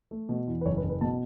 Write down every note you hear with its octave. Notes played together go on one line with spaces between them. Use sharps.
A3
B2
E2
B4
F#1 C#5
B4
F#1
B4
B2 A5